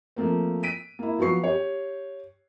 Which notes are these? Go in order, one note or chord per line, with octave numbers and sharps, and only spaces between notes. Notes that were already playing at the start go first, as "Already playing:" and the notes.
F3 A3 A#3 C4
B6 D7 D#7
A#3 E4
F3 F#3 B3 C#6 C7
G4 C#5